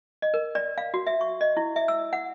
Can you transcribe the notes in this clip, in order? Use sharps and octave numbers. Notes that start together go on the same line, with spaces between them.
D#5
A#4
D5
F5
F#4
E5
C#6
D#5
E4
E5
E6
F#5